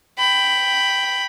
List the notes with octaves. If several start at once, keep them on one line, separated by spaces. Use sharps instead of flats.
G5 B5